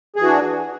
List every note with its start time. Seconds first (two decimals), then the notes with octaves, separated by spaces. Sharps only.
0.16 G#4
0.20 E3
0.23 F#4
0.27 D4